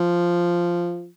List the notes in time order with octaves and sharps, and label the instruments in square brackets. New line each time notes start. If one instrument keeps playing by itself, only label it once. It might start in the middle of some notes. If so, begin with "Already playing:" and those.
Already playing: [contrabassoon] F3